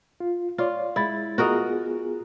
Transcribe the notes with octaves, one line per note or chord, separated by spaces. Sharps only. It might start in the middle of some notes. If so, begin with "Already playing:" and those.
F4
F4 C#5 D5
G#3 E4 A6
B3 F4 F#4 G#4 A#4 D#5